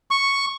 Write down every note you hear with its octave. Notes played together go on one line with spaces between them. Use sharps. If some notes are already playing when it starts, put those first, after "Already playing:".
C#6